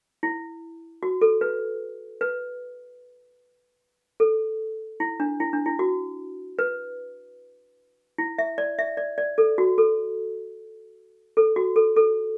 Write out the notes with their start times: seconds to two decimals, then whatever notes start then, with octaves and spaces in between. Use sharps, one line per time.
0.23 E4
1.03 F#4
1.21 A4
1.41 B4
2.21 B4
4.20 A4
5.00 E4
5.20 D4
5.40 E4
5.53 D4
5.66 E4
5.79 F#4
6.59 B4
8.18 E4
8.38 E5
8.58 D5
8.79 E5
8.97 D5
9.18 D5
9.38 A4
9.58 F#4
9.78 A4
11.37 A4
11.56 F#4
11.76 A4
11.96 A4